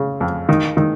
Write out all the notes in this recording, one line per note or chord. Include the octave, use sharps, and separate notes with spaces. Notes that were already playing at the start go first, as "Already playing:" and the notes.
Already playing: C#3
F2
D#3
D#3